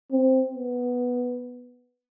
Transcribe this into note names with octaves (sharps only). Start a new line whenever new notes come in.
C4
B3